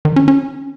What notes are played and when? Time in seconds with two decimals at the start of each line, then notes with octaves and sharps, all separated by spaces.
0.05 D#3
0.16 C#4
0.28 C#4